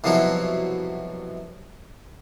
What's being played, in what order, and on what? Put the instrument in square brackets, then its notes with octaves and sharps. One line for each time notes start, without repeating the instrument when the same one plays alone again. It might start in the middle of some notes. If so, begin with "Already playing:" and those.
[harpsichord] C2 B2 F3 F#3 E4 F#4